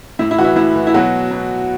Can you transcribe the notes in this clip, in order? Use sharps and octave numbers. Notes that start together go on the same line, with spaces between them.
A2 E4
E4
E3 F#4
E4
A2 E4
E3
E4
B2 F#3 F#4
B2